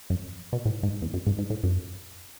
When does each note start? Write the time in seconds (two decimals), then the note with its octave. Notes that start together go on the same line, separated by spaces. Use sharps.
0.10 F#2
0.53 B2
0.65 A2
0.83 G#2
1.02 E2
1.14 F#2
1.27 G#2
1.38 G#2
1.50 A2
1.63 F#2